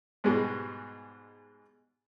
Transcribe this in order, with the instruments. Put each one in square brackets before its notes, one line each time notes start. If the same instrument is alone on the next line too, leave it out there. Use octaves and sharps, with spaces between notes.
[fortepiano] G#2 B2 G3 G#3